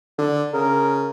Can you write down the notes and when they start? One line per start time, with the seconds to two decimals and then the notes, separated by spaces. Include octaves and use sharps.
0.18 D3
0.53 C#3 A#4